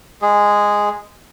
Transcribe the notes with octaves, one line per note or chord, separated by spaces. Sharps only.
G#3 G#4